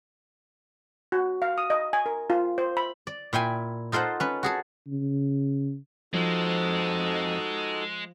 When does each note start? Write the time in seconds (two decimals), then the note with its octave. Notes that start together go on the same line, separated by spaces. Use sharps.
1.12 F#4
1.42 F5
1.58 D#6
1.70 D#5
1.93 G#5
2.06 A#4
2.30 F4
2.58 C5
2.77 B5
3.07 D5
3.33 A#2 E4 G5 G#5
3.92 D#4 F4 A4 C5 F#5
4.20 C#4 B4
4.43 F#4 G#4 A4
4.87 C#3
6.13 F2 F3 G#3 D#4 F#4 A4 C5